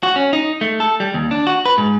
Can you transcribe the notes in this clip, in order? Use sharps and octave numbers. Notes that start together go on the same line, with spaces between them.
F#4
C#4
D#4
A3
A4
G3
D#2
D4
F#4
B4
G#2